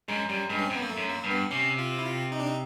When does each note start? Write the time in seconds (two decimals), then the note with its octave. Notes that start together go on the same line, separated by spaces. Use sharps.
0.08 F#2 G#3
0.29 F#2 G3
0.49 G2 G#3
0.58 C#4
0.66 C4
0.70 F#2 B3
0.82 A#3
0.90 A3
0.97 F#2
1.10 A#3
1.24 G2
1.30 B3
1.51 C3 C#4
1.79 F4
1.99 E4
2.05 F4
2.32 D#4
2.40 D4
2.47 D#4